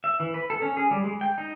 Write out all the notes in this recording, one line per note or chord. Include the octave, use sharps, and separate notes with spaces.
E5
E3
B4
A4
C#4
G#4
G3
G#3
G5
D#4